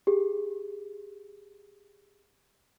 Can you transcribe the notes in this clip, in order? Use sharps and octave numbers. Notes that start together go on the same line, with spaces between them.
G4 G#4